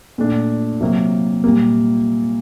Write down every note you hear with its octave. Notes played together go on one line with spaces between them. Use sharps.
A#2 A3 D4
C3 F#3 A#3
A#2 G3 A#3